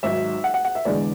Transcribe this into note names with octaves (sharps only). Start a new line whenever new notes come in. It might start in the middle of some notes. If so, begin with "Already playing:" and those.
G#1 G#2 F#3 E5
F#5
F#5
F#5
E5
E1 E2 D3 G#3 D5